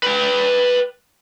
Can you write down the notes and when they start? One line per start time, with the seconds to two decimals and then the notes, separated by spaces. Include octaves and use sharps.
0.03 B4 G5